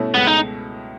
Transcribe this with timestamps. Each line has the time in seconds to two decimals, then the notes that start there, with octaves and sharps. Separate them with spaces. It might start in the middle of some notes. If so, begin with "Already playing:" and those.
Already playing: B2 A3 C#4 E4
0.14 C#2 B3
0.27 D#4